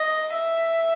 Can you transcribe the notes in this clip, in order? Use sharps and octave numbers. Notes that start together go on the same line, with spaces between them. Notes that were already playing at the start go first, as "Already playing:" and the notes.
Already playing: D#5
E5